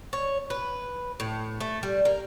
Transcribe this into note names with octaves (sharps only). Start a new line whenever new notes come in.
C#5
B4
A2
A3
G3
A#3